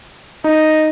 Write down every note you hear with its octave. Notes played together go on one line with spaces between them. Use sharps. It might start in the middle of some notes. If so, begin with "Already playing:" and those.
D#4 D#5